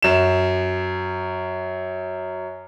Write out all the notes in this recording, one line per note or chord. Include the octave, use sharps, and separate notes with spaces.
F#2 E7